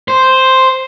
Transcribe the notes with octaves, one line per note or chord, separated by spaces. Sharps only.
C5